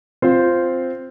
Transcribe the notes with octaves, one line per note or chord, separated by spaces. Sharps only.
C4 F4 C5